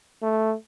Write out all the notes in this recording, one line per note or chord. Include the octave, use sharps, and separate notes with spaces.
A3